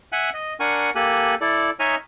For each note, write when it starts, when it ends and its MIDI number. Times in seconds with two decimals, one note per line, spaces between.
0.12 0.30 76
0.12 0.30 78
0.12 0.30 80
0.12 0.30 90
0.34 0.54 75
0.60 0.90 62
0.60 0.90 70
0.60 0.90 78
0.60 0.90 80
0.60 0.90 85
0.95 1.35 58
0.95 1.35 67
0.95 1.35 69
0.95 1.35 80
0.95 1.35 90
1.41 1.70 64
1.41 1.70 69
1.41 1.70 74
1.80 1.96 63
1.80 1.96 73
1.80 1.96 75
1.80 1.96 76
1.80 1.96 80
1.80 1.96 89